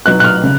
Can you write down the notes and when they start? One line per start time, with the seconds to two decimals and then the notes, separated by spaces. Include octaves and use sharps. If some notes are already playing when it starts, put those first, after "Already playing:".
0.06 B2 F#3 B3 D#4 F#6
0.20 F#6
0.24 F6
0.43 C#3